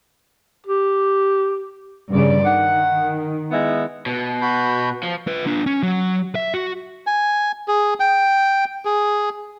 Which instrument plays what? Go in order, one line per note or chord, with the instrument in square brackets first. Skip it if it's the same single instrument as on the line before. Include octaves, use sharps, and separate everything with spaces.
[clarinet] G4
[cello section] G2 C#3 D5
[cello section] D#3 [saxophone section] F#5
[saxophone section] G#3 B3 E4
[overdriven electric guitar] B2
[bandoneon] F#4 B5 G6
[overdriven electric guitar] F3
[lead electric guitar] F4 B4
D4 F4
C#4
F#3
E5
F#4
[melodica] G#5
G#4
G5
G#4